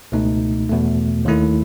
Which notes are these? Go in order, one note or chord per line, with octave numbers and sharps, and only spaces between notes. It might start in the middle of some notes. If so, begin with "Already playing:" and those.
C#2 B2 A3 D#4
E2 B2 A3
D#2 D#3 A3 E4